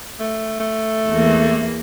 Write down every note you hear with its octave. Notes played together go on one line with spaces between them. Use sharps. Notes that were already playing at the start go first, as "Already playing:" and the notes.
A3
A3
E2 E3 A#3